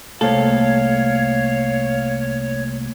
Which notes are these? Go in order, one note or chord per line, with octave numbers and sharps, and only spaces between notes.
C2 A3 A#3 A4 C#5 F5